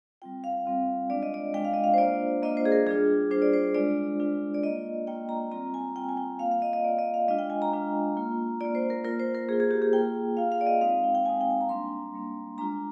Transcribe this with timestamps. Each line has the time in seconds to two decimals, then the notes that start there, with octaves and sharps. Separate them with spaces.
0.22 G3 C4 F4 G5
0.44 F5
0.66 G3 C4 F4
1.10 G#3 D4 F4 D5
1.23 D#5
1.34 D5
1.54 G#3 D4 F4 G5
1.65 F5
1.74 D#5
1.84 F5
1.94 C5
1.98 A#3 D4 F4 D5
2.43 A#3 D4 F4 D#5
2.57 C5
2.65 G#4
2.72 A#4
2.87 G3 D4 F4 G#4
3.31 G3 D4 F4 C5
3.42 D5
3.53 C5
3.75 G#3 D4 F4 D5
4.19 G#3 D4 F4
4.54 D5
4.63 A#3 F4 D#5
5.07 A#3 F4 G5
5.29 A#5
5.51 G3 C4 F4 A#5
5.74 G#5
5.96 G3 C4 F4 G5
6.09 G#5
6.17 G5
6.39 A#3 F4 F5
6.51 F5
6.62 D#5
6.73 D#5
6.84 A#3 F4 D5
6.98 D#5
7.14 F5
7.28 G#3 D4 F4 D#5
7.39 G5
7.50 G#5
7.62 A#5
7.73 G#3 D4 F4
8.17 A#3 F4
8.61 A#3 F4 D5
8.75 C5
8.90 A#4
9.05 A#3 F4 A#4
9.20 C5
9.35 A#4
9.49 A#3 G#4
9.53 F4
9.60 G#4
9.71 G4
9.82 G#4
9.93 A#3 F4 G5
10.37 A#3 F4 F5
10.52 F5
10.61 D5
10.67 D#5
10.81 G#3 C4 D#4 F5
11.04 G5
11.15 G5
11.25 G#3 C4 D#4 G#5
11.41 G5
11.51 G#5
11.61 A#5
11.69 G3 A#3 D4 C6
12.14 G3 A#3 D4
12.58 G#3 D4 F4 A#5